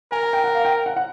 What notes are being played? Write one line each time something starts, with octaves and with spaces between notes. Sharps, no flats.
A#4 G#5
G#5
G5
F#5
F5
G5
F#5
F#5